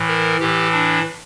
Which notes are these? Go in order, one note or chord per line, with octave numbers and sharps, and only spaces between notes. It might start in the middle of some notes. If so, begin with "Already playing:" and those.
Already playing: A2 E3
A#4
A2 E3 G4
D4